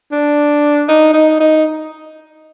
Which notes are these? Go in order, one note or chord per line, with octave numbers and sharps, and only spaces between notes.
D4
D#4
D#4
D#4